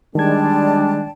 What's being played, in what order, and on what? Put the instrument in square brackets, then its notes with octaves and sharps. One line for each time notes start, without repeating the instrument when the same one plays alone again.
[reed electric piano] D#3 G#6 [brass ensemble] G3 G#3 [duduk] D4 [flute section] D5 G5 A5